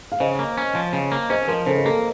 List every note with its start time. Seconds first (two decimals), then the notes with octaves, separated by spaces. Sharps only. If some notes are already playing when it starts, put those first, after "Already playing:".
0.12 F5
0.20 C#3 C5 D#5
0.39 A#3
0.58 C#4
0.75 F3
0.93 C#3
1.12 A#3
1.30 C#4 C5 D#5
1.48 F3 A#4
1.66 C#3 A4 C5
1.77 A#4
1.85 A#3 A4